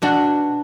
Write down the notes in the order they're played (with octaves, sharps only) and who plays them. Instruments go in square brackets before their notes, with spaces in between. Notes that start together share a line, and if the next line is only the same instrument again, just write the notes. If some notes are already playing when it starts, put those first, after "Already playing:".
[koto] B2 D4 F#4